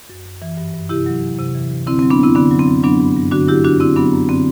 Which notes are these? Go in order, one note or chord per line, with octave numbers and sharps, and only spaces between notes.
F#2
F#2
E3
G2
G2
C3 E4 G4
F#3
E2
C3
E3
D2
D3 C4 E4
F#3 C4
B3 D4
F#2 C4 E4
D3 B3 D4
F#3
C4
F#2
F#3 B3 D4
G2
G2
D3 D4 F#4
F#3 E4 G4
F#2 D4 F#4
D3 C4 E4
F#3 B3 D4
F#2
D3 C4